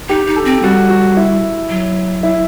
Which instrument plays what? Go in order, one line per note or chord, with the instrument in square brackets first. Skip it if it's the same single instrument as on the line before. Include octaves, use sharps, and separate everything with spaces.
[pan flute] D#4 [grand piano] G4
[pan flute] D#4
[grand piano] A4
[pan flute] C4
[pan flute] G3 [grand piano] F#4
[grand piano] F#4
E4
[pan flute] F#3
[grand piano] E4